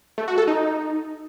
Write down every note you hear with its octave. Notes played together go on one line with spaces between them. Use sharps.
A3
F#4
A4
D#4